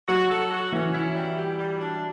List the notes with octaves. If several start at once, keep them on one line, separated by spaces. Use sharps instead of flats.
F#3 F#4
A4
F#4
E3 C#4
E4
G3
G4
G3
D4